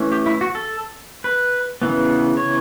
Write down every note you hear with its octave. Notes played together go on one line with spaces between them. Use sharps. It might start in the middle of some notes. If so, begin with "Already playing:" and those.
Already playing: E3 A3 C#4
G4
E4
F#4
A4
B4
C#3 E3 B3
C#5